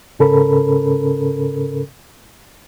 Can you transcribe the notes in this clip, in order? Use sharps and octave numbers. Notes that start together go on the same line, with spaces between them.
G#2 C#3 C#4 A4 A#4 B5